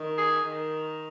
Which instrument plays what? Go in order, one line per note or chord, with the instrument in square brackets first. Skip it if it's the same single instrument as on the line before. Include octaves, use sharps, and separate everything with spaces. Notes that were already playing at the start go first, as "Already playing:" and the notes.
Already playing: [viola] D#3
[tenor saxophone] G#4
[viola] D#3